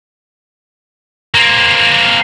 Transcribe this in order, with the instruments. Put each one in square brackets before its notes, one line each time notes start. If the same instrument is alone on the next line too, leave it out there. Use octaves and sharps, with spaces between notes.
[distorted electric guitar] A#3 C4